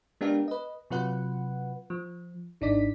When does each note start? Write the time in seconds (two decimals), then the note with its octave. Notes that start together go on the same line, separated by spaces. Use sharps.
0.21 G#3 B3 D4 G4 A#4 F5
0.48 B4 D#5
0.90 C3 F#3 F4 B4 F#5
1.90 F3
2.61 G#1 D4 D#4 D5 B6